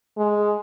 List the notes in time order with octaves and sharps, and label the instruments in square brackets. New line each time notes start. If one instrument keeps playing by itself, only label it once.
[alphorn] G#3